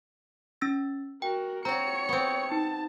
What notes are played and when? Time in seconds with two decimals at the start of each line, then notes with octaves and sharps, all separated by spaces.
0.61 C#4 E6 A6
1.22 F#4 A#4 G5
1.65 C4 F#4 C#5 A#5 C#7
2.09 B3 C4
2.52 D#4 A5